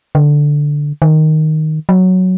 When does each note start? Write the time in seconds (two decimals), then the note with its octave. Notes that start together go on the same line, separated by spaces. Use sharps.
0.15 D3
1.02 D#3
1.89 F#3